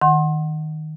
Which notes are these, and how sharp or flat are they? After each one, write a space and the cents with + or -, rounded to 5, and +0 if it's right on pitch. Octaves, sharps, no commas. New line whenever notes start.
D#3 +0 F#5 +0 C6 +30